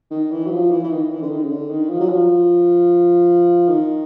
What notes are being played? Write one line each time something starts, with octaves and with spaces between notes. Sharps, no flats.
D#3
E3
F#3
F3
E3
E3
D#3
E3
D3
D#3
C#3
D3
D#3
F3
F#3
F3
D#3